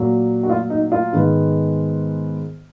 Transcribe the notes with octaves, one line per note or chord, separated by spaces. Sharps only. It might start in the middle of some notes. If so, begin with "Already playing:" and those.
Already playing: A#2 F#3 A#3
F#4
F4
D#4
F4
G#2 D#3 G#3 B3